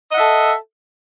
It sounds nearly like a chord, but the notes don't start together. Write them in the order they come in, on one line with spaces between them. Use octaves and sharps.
D#5 F#5 E5 A4